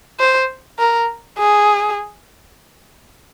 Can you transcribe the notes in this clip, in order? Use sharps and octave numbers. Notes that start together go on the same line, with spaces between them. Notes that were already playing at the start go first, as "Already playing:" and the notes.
C5
A#4
G#4